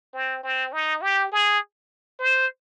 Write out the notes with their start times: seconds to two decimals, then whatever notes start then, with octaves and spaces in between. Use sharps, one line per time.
0.14 C4
0.44 C4
0.73 D#4
1.02 G4
1.32 G#4
2.20 C5